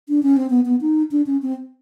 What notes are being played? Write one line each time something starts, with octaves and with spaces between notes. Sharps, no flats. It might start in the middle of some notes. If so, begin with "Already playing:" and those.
D4
C#4
C4
B3
B3
D#4
D4
C#4
C4